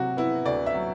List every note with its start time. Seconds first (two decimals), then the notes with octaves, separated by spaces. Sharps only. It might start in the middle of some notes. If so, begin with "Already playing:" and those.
Already playing: C3 F#3 F#4
0.17 B3 E4
0.46 D2 D5
0.66 E5
0.74 F#3